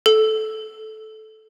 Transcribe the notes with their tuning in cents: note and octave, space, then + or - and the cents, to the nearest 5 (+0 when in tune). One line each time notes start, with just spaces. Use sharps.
A4 -15